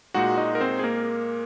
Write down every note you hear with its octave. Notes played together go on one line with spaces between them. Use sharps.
A#2 G#3 D#4 F#4 F#5
D#4 D#5
A#4
C4 C5
G#4
A#3 A#4